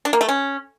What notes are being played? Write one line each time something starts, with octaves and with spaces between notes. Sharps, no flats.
D4
A#3
A3
C#4